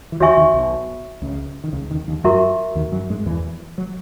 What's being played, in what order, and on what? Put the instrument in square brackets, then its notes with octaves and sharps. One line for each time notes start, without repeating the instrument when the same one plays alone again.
[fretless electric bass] E3
[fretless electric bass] D#2 D#3 [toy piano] F#4 C#5 E5 G#5 C#6
[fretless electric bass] D#2 D#3
B1 B2
C#2 C#3
D#3
C#2 C#3
D#2 D#3
D#2 D#3
[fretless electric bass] F#2 F#3 [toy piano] F#4 A#4 E5 A#5 C#6
[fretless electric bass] D#2 D#3
F#2 F#3
G#2 G#3
E2 E3
F#3